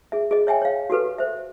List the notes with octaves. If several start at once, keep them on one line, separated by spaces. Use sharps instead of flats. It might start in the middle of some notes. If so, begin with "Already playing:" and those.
G#4 E5
G#4 D#5
C#5 E5 G5 G#5
C#5 F5
F#4 G4 A4 B4
C5 E5